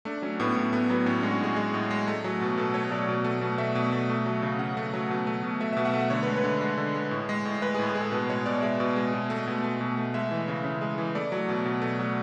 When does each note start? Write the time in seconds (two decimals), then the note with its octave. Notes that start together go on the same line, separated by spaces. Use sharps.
0.05 A3 D4
0.22 F#3 C#4
0.40 A2 B3
0.56 A2
0.73 A3 B3
0.89 F#3 B3
1.06 A2 C#4
1.20 G#3 D4
1.31 F#4
1.40 A2 G#4
1.56 G#3
1.74 A2
1.91 G#3
2.08 A3
2.24 F#3
2.41 B2
2.57 B2 A4
2.74 A3 C#5
2.91 F#3 D5
3.09 B2
3.24 A3
3.41 B2
3.58 A3 E5
3.75 B2
3.92 A3
4.10 A3
4.26 F#3
4.42 C#3
4.59 C#3 F#5
4.77 A3
4.93 F#3
5.10 B2
5.27 A3
5.43 B2
5.61 A3 E5
5.73 B2 E5
5.85 F#5
5.94 A3 E5
6.10 D3 C#5
6.23 B4
6.27 G#3
6.36 B4
6.44 D3
6.61 G#3
6.78 D3
6.95 G#3
7.11 A2
7.29 G#3
7.45 A2
7.62 G#3 B4
7.75 G#4
7.79 A2
7.87 G#4
7.95 G#3
8.00 A4
8.12 B2 B4
8.29 G#3 C#5
8.46 B2 D5
8.62 G#3 E5
8.80 B2
8.96 G#3
9.14 B2
9.30 A3
9.47 B2
9.64 A3
9.81 B2
9.97 A3
10.14 G#3 E5
10.31 E3
10.48 C#3
10.65 C#3
10.81 G#3
10.98 E3
11.15 A3 D5
11.32 F#3
11.48 B2
11.66 B2
11.82 A3
11.99 F#3